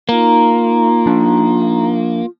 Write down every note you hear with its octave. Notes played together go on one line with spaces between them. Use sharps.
A#3 D#4 F4 A#5
F3 D4